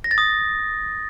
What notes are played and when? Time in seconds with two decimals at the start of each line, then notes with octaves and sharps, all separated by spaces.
0.04 A#6
0.11 A6
0.18 D#6